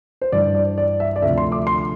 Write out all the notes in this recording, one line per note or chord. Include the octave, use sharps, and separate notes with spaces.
C5
G2 E3 G3 D5
D5
D5
E5
D5
D2 C3 F3 E5
C6
D6
C6